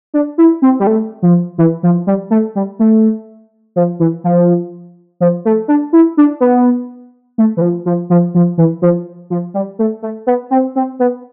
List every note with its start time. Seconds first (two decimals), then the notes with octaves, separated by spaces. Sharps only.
0.14 D4
0.38 E4
0.62 C4
0.80 G3
0.87 A3
1.23 F3
1.58 E3
1.83 F3
2.07 G3
2.30 A3
2.55 G3
2.79 A3
3.76 F3
4.00 E3
4.24 F3
5.20 F3
5.45 A3
5.68 D4
5.93 E4
6.17 D4
6.41 B3
7.38 A3
7.57 E3
7.61 F3
7.86 F3
8.10 F3
8.35 F3
8.58 E3
8.82 F3
9.30 F3
9.54 G3
9.79 A3
10.02 A3
10.27 B3
10.51 C4
10.76 C4
10.99 B3